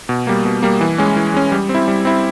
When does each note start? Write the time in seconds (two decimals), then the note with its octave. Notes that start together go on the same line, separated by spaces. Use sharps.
0.09 B2
0.27 G3 A#3
0.45 B2
0.63 G3 A#3
0.81 E3
0.98 G#3 C#4
1.16 E3
1.34 G#3 C#4
1.52 G3
1.69 C4
1.75 E4
1.88 G3
2.05 C4 E4